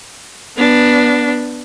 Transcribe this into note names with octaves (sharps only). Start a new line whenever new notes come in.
B3 D4